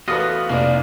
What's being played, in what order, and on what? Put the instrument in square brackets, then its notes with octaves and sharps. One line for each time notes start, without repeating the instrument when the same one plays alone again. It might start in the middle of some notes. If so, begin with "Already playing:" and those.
[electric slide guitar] E2 A3 [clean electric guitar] B3 F4 D#5 [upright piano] F#4 A4 B4
[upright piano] F1 [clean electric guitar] A#3 [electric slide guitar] E4 C#5 D5